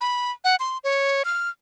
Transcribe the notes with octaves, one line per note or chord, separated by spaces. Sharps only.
B5
F#5
C6
C#5
F6